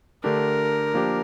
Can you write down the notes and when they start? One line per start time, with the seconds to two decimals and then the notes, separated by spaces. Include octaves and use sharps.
0.24 D3 A3 D4 G4 A#4
0.94 F3 A#3 D4 G4